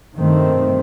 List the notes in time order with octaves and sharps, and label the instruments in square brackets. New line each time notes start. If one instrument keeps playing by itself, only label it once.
[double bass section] G2 D#3 A3 C4